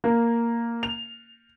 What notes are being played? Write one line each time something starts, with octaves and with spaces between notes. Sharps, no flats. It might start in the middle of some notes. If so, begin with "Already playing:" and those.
A#3
F7